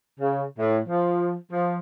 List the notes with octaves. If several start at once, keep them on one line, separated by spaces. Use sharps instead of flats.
C#3
A2
F3
F3